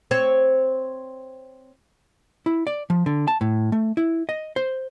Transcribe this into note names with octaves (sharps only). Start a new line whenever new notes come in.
C4 C#5
E4
D5
F3
D3
A5
A2
A3
E4
D#5
C5